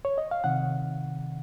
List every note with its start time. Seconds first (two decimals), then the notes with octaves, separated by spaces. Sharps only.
0.05 C#5
0.18 D#5
0.31 F5
0.44 C3 D#3 F#5